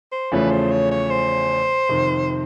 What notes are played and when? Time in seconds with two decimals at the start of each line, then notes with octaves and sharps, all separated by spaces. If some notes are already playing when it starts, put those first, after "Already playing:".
0.12 C5
0.32 E2 C#3 F3 A3 C#4 B4
0.51 C5
0.72 C#5
0.91 C#5
1.10 C5
1.89 F2 C3 D#3